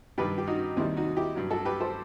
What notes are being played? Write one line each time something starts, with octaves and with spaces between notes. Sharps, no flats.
G2 D#3 G3 G4 B4
G4
D#4 F#4
D#2 D#3 G3 C4 E4
D#4 F#4
E4 G4
G2 F#3
F#4 A4
G4 B4
A4 C5